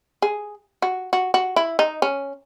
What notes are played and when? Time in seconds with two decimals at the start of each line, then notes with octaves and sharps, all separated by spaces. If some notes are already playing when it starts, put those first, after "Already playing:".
0.22 G#4
0.82 F#4
1.13 F#4
1.34 F#4
1.56 E4
1.79 D#4
2.02 C#4